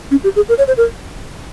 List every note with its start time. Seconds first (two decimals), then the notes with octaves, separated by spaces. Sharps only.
0.11 C#4
0.24 G4
0.36 G#4
0.49 A#4
0.58 C#5
0.68 C5
0.77 A#4